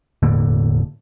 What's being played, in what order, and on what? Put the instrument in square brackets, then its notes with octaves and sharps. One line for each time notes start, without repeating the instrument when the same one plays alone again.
[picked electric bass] E1 A2 D3 A#3